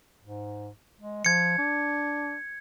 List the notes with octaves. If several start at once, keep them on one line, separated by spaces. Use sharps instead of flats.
G#2
G#3
F3 G#6 C#7
D4